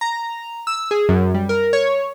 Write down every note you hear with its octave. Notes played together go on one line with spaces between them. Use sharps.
A#5
E6
G#4
F#2
G3
A#4
C#5